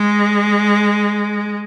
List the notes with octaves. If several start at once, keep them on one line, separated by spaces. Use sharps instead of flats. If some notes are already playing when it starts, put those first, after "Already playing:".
Already playing: G#3